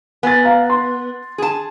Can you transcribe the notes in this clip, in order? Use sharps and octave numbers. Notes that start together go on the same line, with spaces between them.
B3 G#5 A6
F5 A#5
C6
G#4 A5